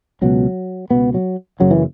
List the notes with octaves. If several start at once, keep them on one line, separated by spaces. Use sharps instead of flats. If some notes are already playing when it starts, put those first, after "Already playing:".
C#2 B2 F#3
C#2 B2 B3
F#3
F#1 F#2 C#3 F#3
E3